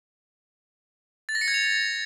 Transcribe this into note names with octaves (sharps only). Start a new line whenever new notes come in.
A6
A#6
C#7
G#6
F7